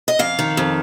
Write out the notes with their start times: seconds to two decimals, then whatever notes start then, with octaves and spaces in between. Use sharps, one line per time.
0.08 D#5
0.19 F2 F5
0.39 D#3
0.57 F2